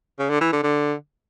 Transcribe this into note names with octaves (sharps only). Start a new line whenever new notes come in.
C#3
D3
E3
D3
D3